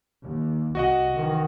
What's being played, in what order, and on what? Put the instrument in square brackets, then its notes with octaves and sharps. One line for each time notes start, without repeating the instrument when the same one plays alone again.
[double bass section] D#2
[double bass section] C2 [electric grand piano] F#4 D#5 F#5
[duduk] D#3 [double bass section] E3